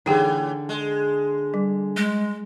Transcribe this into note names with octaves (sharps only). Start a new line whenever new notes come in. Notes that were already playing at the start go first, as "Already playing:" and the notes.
A2 D3 E3 D#4 G4 G#4 G5 G#5
G#3
G3
G#3